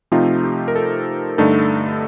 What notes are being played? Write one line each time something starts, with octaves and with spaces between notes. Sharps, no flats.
C3 F3 A3 C4 D#4 F4
G4
A#4
A4
G2 D3 A3 D#4 A4